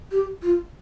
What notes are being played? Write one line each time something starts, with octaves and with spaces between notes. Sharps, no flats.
G4
F4